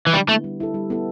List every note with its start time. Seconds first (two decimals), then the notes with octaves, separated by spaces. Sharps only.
0.07 E3
0.14 D3 G3
0.29 A3 B3 E4
0.44 G3
0.60 E4 A4
0.74 G3
0.90 B3 E4 A4